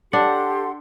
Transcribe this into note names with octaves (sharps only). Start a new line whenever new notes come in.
D4 G4 A4 F#5 C6